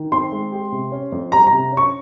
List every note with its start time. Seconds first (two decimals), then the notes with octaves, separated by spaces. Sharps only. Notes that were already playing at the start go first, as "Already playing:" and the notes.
Already playing: D#3
0.12 C4 C6
0.32 G#3
0.52 G4
0.72 C3
0.92 C#4
1.12 F2
1.32 G3 A#5
1.47 A#5
1.53 C3
1.72 C#4
1.77 C#6